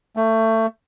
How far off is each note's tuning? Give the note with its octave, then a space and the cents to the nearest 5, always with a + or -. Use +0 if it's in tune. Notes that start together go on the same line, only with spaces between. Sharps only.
A3 +25